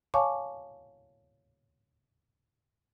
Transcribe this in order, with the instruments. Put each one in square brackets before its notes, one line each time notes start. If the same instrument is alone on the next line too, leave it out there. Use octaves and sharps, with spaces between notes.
[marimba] C#5 F5 G#5 A5 C#6 D6